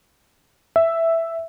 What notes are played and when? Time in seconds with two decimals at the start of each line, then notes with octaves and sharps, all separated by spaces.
0.76 E5